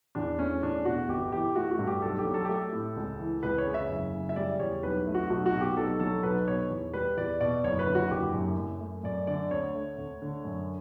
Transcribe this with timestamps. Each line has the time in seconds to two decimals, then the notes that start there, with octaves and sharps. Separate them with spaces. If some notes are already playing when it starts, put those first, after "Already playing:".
0.15 E2 D4
0.39 A3 C#4
0.63 E2 D4
0.85 B2 F#4
1.09 G1 G4
1.32 E3 G4
1.56 A3 F#4
1.71 F#4
1.79 G2
1.87 G4
2.02 B1 A4
2.19 G4
2.25 F#3
2.34 A4
2.45 A3 G4
2.54 A4
2.73 A2
2.96 C#2
3.20 E3
3.43 C#2 B4
3.58 C#5
3.66 C#3
3.74 E5
3.90 F#1
4.13 C#3
4.29 E5
4.36 G3 D5
4.60 E2 C#5
4.83 B1 B4
5.07 A3
5.15 F#4
5.30 B1 F#4
5.46 F#4
5.54 B2
5.61 G4
5.77 B1 A4
6.00 F#3 A4
6.23 B1 B4
6.47 B2 C#5
6.70 E2
6.94 G3 B4
7.17 E2 D5
7.40 B2 D5
7.64 F#1 C#5
7.79 B4
7.87 D3
7.95 F#4
8.11 F#1 G4
8.34 F#2
8.58 F#2
8.80 A3
9.04 F#2 D5
9.27 D3 D5
9.51 D2 C#5
9.75 A3
9.98 D2
10.22 D3
10.45 F#2